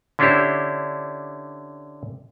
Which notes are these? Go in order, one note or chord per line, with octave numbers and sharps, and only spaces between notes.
D3 C#4 D4 E4 G4 C5